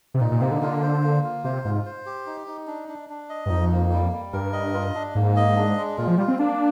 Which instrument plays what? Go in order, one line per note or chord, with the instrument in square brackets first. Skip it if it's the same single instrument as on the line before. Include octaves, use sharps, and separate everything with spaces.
[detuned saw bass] C3
[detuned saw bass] A#2 [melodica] D#4
[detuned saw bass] A#2
[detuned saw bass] C3 [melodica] A#3
[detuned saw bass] D3
[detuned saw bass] D3 [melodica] F4
[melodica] C5
A#3
F4
[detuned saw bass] C3 [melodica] C5
[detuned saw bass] G#2 [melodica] F4
[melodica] C5
G4
D#4
D#4
D4
D4
D4
D#5
[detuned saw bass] G2
[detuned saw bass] F2 [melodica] D#4
[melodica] A#3
G3
G3
[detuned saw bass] G2 [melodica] A#4
[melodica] D#5
F4
D4
[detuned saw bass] G#2 [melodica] A#3
[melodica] D#5
D4
G#3
[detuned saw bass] A#2 [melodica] F4
[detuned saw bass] F3
[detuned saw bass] G3 [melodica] F4
[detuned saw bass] C4
[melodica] A#3 [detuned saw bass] D4